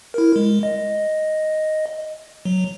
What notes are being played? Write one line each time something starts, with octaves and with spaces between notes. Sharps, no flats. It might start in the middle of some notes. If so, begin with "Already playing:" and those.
E4 A#4
G#3
D#5
F#3